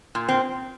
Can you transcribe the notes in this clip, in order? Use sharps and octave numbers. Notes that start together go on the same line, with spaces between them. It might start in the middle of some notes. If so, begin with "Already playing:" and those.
A#2
C4